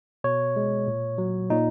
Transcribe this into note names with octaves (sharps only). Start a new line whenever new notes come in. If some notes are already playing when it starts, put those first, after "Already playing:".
B2 C#5
G#3
A#2
F#3
A#2 D#4